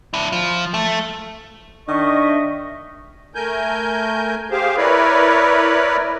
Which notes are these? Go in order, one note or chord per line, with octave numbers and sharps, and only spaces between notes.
D4 E4
F3
A3
D#3 D4 D#5 E5 C#6
A3 A#4 G#5 G6
G4 G#4 C5 F5
E4 A#4 B4 C#5 D5